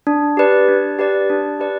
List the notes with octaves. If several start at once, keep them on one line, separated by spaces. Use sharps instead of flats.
D4
G4 B4 D5
D4
G4 B4 D5
D4
G4 B4 D5